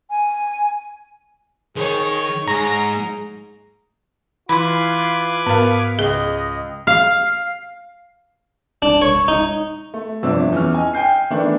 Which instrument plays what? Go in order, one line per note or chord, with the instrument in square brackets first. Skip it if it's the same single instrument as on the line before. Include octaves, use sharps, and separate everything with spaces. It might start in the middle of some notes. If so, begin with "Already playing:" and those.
[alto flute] G#5
[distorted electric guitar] D#3 [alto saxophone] G#4 [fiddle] C#5
[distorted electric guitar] G#2 [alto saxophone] G#4 [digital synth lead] A#5
[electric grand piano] E3 [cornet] F4 [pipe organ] B4 D6 G#6 [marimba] B5 C6
[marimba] G#2 A#4 [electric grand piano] B3 F5
[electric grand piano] C#2 [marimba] G#4 [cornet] D#5
[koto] F5
[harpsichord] D4
C#5
D#4
[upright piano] A3
G1 C3 F3 D4 E6
E2 C#4 F6
D#5 G#5
G5 G#5 G6 C7
D#3 E3 A3 B3 D4